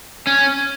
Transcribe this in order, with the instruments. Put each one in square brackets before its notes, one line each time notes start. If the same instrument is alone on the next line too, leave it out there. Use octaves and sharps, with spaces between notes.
[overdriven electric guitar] C#4